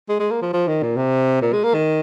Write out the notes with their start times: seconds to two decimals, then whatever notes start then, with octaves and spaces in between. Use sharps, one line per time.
0.09 G#3
0.20 G#3
0.31 A#3
0.42 F3
0.53 F3
0.68 D#3
0.83 A#2
0.97 C3
1.42 A#2
1.53 G#3
1.64 A#3
1.74 D#3